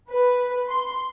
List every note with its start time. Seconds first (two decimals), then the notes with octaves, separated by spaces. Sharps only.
0.10 B4
0.68 C6